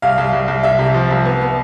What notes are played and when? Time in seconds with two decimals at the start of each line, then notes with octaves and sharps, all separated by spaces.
0.02 C2 F5
0.18 C2
0.33 C2
0.48 C2
0.63 C2 E5
0.79 C3
0.94 F3
1.11 C2
1.25 B3
1.42 B3